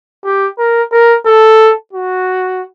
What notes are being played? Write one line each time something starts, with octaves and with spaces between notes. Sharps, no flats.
G4
A#4
A#4
A4
F#4